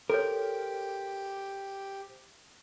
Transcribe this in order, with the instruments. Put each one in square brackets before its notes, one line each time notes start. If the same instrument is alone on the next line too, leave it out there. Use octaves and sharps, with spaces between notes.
[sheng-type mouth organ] G4 [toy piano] A4 C#5 [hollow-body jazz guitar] A#4 [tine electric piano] C5